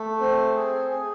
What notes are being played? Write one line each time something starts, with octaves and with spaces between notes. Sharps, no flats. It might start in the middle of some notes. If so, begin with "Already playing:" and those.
Already playing: A3
C4
G#4
G#4